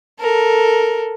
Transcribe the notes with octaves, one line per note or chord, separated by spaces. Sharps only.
A4 A#4